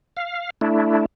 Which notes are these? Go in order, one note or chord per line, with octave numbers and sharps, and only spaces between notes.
F5
A3 D4 E4